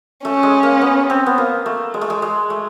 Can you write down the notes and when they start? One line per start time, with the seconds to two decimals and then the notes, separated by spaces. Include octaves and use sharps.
0.25 A3 C#4
0.43 G#3
0.63 A#3
0.82 B3
1.10 C4
1.26 B3
1.38 A#3
1.66 A3
1.94 G#3
2.01 A3
2.10 G#3
2.22 G#3
2.50 A3